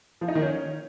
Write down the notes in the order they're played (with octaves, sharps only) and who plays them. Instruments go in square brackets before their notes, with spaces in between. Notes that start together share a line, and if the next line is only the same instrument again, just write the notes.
[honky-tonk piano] F3
D#4
D#3
C#4